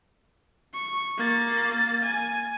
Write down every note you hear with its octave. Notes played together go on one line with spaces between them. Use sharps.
C#6
A#3 A6
G#5